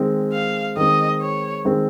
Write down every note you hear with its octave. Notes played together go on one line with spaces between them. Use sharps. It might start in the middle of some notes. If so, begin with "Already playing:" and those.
Already playing: D#3 G#3 C4
F5
D#3 G#3 C4 D#5
C#5
D#3 G#3 C4